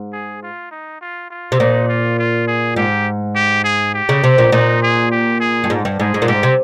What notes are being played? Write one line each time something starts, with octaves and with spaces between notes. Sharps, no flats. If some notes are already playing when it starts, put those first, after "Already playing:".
Already playing: G#2
G#4
F4
D#4
F4
F4
C3
A#2 D#4
F4
F4
G#4
G#2 G4
G4
G#4
G4
C#3
C3
A#2
A#2 D#4
G#4
G4
G#4
G2
G#2
G2
G#2 G#4
G#2
A#2
G#2 G4
C3